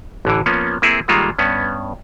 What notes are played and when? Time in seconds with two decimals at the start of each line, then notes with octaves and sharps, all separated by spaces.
0.25 A1 D3 E3
0.46 F3 A#3 B3 C#4
0.82 A#3 C4 E4 G#4 A4
1.08 D#3 G3 G#3 A#3 F4 A4
1.38 G2 B3 C#4